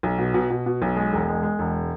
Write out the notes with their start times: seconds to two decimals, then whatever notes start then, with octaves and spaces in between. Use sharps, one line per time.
0.03 B1
0.18 B2
0.34 B2
0.51 B2
0.66 B2
0.82 B1
0.97 G#3
1.13 E1
1.28 G#3
1.43 G#3
1.59 E1